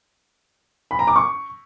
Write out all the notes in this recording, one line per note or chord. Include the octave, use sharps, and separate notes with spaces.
B5
A#5
D6
C#6